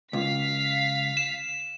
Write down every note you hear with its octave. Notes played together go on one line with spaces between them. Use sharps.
C#2 F5 B6
E7